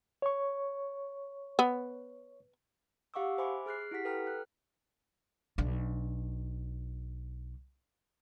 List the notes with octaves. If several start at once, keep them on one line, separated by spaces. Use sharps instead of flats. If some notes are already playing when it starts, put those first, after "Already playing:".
C#5 C#6
B3
G4 F5 F#5 C#6 D6 E6
C5 E5 G#5 B5 C6 D6
G#4 F6 F#6 C7
E4 G4 F#5 B6
A4 B4 G5 A#5 F6
F#6
B1 D4